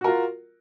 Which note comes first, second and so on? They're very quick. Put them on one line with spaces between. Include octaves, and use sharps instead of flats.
F#4 A#4 F4